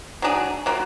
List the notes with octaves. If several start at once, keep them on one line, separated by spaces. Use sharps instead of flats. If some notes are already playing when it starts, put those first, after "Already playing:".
F#3 D4 G#4
F#3 A#3 F4